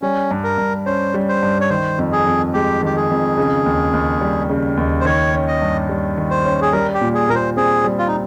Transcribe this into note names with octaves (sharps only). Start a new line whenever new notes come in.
G3 C#4
G2
A#4
G2
C#4 C5
G3
C5
G2
C#5
D#3 C5
F2
G#4
F2
G#3 G4
D#3 G4
G#4
F2
C#3
D#2
D#2
G3
C#3
D#2
C5
D#3 C#5
C#4
D#5
G2
G3
D#3
C5
C#4
G#4
G3 A#4
G4
A#2
G#4
A#2 A#4
C5
C4 G#4
G3
F4
D#4